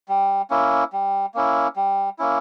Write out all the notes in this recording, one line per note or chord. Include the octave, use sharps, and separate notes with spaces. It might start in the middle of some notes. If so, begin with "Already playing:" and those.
G3
A#3 C#4 E4
G3
A#3 C#4 E4
G3
A#3 C#4 E4